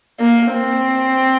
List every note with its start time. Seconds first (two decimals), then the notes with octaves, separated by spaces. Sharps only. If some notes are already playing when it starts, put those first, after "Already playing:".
0.20 A#3
0.54 C4